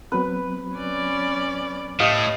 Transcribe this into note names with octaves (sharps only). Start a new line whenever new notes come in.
F#3 B3 C4 B4
C#4 D5
A2 A3 G4 D#5 F5